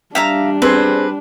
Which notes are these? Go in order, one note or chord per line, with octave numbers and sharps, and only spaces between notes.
G3 D4 E5 F5 A#5
C4 G#4 B4 C5